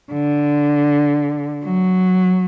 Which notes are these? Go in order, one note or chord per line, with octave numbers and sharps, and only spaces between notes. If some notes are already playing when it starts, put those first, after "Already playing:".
D3
F#3